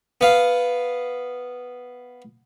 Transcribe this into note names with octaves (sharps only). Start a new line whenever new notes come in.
B3 F5